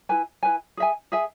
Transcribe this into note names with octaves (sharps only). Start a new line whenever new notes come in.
E4 B4 G#5
E4 B4 G#5
G#4 E5 G#5
G#4 E5 G#5